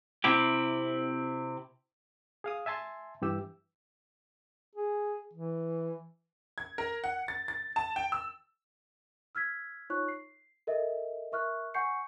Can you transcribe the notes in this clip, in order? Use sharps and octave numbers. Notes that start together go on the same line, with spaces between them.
C3 C4 E4 G4
G#4 F5 D#6
E5 G#5 A5 C6
G2 E3 G4 E6
G#4
E3
G#6
A#4
F#5
A6
A6
A5
G5
E6
E6 F6 G#6 B6
D#4 F4 C#5 C#6 F#6
C7
A4 A#4 D#5 E5
A#4 E5 C#6 F6 F#6
F#5 G#5 C#6 G6 C7 C#7